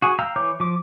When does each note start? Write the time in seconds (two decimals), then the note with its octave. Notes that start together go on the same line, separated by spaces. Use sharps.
0.02 F#4 G#4 G#5
0.19 F5 G5 A#5 E6
0.36 E3 C#5 D6 G6
0.60 F3 D6